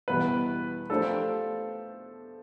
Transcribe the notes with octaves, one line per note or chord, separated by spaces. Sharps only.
E2 B2 G3 B3 E4 B4
F3 A3 D4 G4 A4 C5